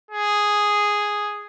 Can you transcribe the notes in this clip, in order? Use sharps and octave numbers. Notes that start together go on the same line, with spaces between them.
G#4